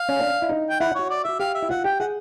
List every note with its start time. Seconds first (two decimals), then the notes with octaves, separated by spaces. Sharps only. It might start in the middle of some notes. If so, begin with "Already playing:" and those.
Already playing: F5
0.09 C#4
0.20 D4
0.42 E4
0.49 D#4
0.70 G5
0.80 E4 F#5
0.95 F#4 C#5
1.10 D5
1.24 F#4 E5
1.40 G4 F5
1.55 E5
1.62 E4
1.69 F4 F#5
1.84 G4 G5
2.00 G#4 F#5